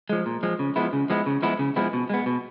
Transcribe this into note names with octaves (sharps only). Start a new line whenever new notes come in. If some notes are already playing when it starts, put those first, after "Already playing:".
F3 G#3
A#2
F3 G#3
C#3
F3 G#3 B3 E4
C#3
F3 G#3 B3 E4
C#3
F3 G#3 B3 E4
C#3
F3 G#3 B3 E4
B2
G#3 B3
B2